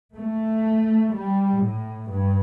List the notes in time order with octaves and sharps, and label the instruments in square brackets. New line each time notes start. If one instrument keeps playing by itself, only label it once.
[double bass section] A3
G3
A2
G2